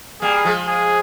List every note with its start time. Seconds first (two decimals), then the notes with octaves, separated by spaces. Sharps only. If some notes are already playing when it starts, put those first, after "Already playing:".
0.22 G3 A#3 G#4
0.45 F3 G#3
0.68 G#4